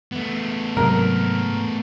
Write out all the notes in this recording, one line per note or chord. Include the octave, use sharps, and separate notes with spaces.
A3 B3
G#2 C3 F#3 A#4